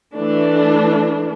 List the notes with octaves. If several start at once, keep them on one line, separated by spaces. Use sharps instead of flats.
E3 A3 D4